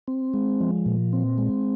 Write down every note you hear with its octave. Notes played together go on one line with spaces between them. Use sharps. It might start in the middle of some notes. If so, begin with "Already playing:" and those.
C4
G#3
F3
A#2
C4
G#3